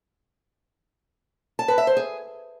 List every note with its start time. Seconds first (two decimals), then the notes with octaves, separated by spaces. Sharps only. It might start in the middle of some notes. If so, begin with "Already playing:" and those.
1.59 A5
1.68 B4
1.78 E5
1.87 C5
1.97 G#4